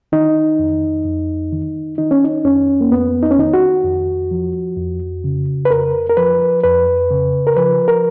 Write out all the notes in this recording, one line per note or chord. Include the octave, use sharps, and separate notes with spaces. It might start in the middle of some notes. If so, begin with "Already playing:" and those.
D#3 D#4
F2
F2
D#3
D#3 D#4
C#4
D#4
F2 C#4
A#3
F2 B3
D#4
C#4
D#3 D#4
F#4
F2
F3
F2
C#3
B4
F2 A#4
A#4
F3 B4
F2 B4
C#3
A#4
F3 B4
A#4